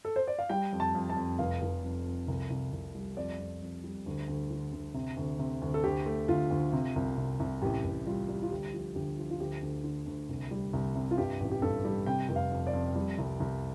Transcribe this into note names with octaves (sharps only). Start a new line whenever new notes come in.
A4
C5
D5
F5
G3 G5
F2
A5
F2
A5
F2
F1 F5
F1
F2
F2
C2
C2
C2
G3
F2 D5
F2
F2
G3
D2
D2
D3
D2
C3
D2
C3
D2
A4
D2 G4
A3
D2 F4
D2
C3
C2
C3
C2
A1 G4
A1
G3 F4
G3
F4
D2 G4
F3
D2 G4
F3
F4
D2 G4
D2
D3
D2
C2
G3
C2
C3
F4
G2 G4
A1
G4
G2 A4
G3
C3 G5
F1
F5
F2
D5
F2
G3
C2
C2